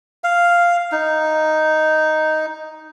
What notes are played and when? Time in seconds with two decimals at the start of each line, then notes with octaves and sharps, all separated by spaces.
0.24 F5
0.92 D#4